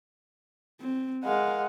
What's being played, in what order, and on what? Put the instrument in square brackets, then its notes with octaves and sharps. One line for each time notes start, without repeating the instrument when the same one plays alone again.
[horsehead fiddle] C4
[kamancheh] G#3 F#5 [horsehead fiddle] A#4 F5